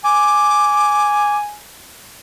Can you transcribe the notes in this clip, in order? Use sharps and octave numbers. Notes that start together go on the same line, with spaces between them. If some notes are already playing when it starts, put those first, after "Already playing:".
G#5 D6